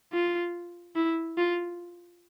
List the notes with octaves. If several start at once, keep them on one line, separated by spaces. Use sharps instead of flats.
F4
E4
F4